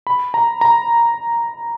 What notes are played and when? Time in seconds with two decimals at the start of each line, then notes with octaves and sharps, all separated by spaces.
0.07 B5
0.34 A#5
0.61 A#5